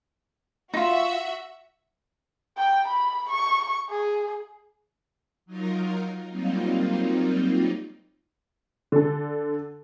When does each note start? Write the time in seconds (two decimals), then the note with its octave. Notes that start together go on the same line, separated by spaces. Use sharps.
0.74 D#4 F4 F#4 E5
2.58 G5
2.87 B5
3.30 C#6
3.90 G#4
5.46 F#3 D#4 F4 A#4
6.29 F#3 G3 A#3 C4 D#4 F4
8.92 D3 A4